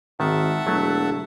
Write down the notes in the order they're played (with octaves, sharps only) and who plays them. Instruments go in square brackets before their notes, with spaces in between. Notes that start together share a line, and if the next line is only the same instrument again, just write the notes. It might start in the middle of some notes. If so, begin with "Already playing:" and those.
[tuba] G#1 [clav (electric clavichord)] D#3 [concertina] E5 F#5 A5
[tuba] E1 [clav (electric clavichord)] F#3 A3